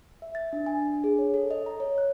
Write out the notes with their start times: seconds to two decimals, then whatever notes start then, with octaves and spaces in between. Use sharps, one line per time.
0.22 E5
0.35 A6
0.53 D4
0.66 G#5
0.82 D4
1.04 G#4
1.18 C#5
1.34 A4
1.51 D#5
1.66 A#5
1.80 C#5
1.98 F#6